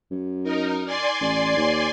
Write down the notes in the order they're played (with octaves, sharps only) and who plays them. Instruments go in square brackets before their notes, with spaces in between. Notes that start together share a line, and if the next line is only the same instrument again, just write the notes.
[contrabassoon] F#2
[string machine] D#4 A#4
D5 G#5 C6
[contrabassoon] A1
D#2